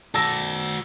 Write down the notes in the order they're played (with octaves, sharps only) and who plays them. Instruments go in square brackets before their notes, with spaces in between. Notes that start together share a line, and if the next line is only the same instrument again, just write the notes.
[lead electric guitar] F#4 D5 [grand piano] A5 E6 A#6